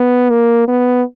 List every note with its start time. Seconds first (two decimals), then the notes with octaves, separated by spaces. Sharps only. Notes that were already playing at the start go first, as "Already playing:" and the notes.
Already playing: B3
0.30 A#3
0.68 B3